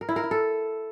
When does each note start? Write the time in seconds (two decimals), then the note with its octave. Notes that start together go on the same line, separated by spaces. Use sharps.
0.01 A#4
0.09 E4
0.16 A#4
0.24 E4
0.31 A4